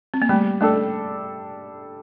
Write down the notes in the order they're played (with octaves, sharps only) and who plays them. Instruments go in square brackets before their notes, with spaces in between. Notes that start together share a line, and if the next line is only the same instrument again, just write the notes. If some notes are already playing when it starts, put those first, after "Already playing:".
[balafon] C4
A#3
[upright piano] G3 [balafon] A3
[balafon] A3 [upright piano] D4 A4